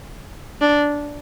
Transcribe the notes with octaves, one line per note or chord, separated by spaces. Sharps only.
D4